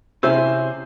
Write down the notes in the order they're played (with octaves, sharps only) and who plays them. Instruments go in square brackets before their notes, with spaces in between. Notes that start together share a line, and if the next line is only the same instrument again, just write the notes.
[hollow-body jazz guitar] C3 C#4 [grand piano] E4 G#4 C5 [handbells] E6 G6